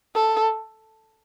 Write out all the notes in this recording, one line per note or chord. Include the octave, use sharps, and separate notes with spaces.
A4